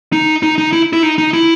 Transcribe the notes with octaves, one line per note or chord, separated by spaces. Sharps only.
D#4
D#4
D#4
E4
E4
D#4
D#4
E4